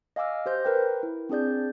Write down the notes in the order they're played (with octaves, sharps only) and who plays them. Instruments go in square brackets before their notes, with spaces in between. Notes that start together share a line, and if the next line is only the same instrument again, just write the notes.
[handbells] D#5 F5 G#5 D6 E6 F6
G4 C5 G6 A#6
A#4 B4 G5
E4
C4 D4 G#4 D5 G6